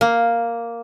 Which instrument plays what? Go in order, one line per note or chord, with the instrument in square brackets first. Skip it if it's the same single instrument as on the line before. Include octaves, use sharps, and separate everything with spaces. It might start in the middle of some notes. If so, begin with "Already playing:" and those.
[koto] A#3